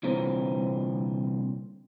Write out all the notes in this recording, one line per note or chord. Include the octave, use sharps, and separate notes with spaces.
C2 A#2 D3 E3 C4 A#5